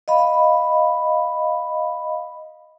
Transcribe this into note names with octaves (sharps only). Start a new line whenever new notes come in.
D#5 F5 B5